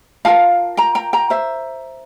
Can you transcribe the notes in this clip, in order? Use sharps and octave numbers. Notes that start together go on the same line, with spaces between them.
F4 A#4 F5 A5
G5 A#5
G5 A#5
G5 A#5
C5 E5